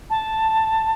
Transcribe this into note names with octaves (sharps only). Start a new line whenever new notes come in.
A5